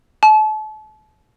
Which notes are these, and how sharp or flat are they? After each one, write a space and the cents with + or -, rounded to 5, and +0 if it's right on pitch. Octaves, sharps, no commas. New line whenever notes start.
A5 -35